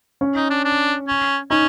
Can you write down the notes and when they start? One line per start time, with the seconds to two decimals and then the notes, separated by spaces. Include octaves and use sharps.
0.21 C#4
0.36 D#4
0.50 D4
0.65 D4
1.08 C#4
1.50 C#4 D#4